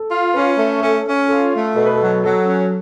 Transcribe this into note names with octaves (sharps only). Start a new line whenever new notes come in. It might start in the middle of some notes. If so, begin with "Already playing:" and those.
Already playing: A4
F4
C#4 B4
A3
C#4 A4
C#4
F4 A4
A3
B2 A4
B4
F#3 A4
F#3 A4
C#4